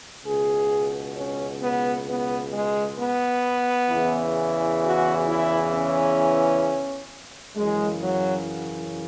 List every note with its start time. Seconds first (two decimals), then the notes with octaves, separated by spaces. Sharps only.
0.24 C#2 B2 G#4
1.15 C#4
1.62 B3
2.07 B3
2.53 G#3
2.98 B3
3.90 E2 C#3 E3
4.82 F#4
5.27 E4
5.73 C#4
7.56 F#2 C#3 E3 G#3
8.03 F#3